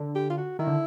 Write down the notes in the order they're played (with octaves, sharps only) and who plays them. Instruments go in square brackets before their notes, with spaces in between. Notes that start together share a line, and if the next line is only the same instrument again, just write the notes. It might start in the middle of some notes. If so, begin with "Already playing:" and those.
Already playing: [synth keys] D3
[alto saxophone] G4
F4
F#4
[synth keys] D#3 [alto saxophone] E4
[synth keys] D3